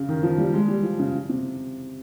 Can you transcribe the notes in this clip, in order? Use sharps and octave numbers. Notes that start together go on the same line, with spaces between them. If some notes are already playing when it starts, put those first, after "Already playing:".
Already playing: C#3
D#3
F3
G3
G#3
G3
F3
C#3
C3